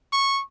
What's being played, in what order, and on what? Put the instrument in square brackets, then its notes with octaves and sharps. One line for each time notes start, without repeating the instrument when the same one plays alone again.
[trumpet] C#6